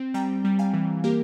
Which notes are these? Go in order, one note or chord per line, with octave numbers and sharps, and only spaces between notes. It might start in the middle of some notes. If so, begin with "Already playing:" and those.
Already playing: C4
G3 G5 A#5
G3
F5 G#5
E3
A#3 G4 A#4